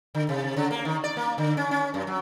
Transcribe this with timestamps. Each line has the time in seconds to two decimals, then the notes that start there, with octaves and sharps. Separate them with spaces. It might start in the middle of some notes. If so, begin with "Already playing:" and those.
0.15 D3
0.29 C3
0.57 C#3
0.71 A#3
0.85 D#3
1.04 D5
1.17 A#3
1.38 D3
1.57 C#4
1.71 C#4
1.94 F#2
2.07 F#3